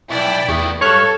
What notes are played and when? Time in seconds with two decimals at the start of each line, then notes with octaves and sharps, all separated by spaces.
0.10 B1 E4 D5 G5
0.49 E2 A3 B3
0.81 G2 A4 C#5 C#6 F6 F#6